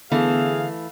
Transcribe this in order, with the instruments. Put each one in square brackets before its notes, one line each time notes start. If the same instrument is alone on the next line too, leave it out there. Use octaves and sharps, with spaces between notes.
[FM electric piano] D3 B3 [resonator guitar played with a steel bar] E3 A3 [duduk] G#4 [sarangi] F5